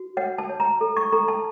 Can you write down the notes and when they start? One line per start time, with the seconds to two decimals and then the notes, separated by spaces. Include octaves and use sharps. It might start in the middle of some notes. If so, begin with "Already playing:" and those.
Already playing: F#4
0.17 C#5 F#5
0.38 A5
0.49 C#5
0.60 A#5
0.81 A4
0.97 C#6
1.12 A4 A#5
1.28 A5